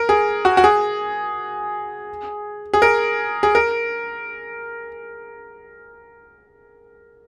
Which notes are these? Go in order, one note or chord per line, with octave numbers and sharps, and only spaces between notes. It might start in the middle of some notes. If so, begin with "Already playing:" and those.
Already playing: A#4
G#4
F#4
F#4
G#4
G#4
A#4
G#4
A#4